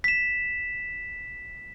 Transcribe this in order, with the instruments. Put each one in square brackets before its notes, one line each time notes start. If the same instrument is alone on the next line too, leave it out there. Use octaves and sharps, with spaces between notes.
[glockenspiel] B6 E7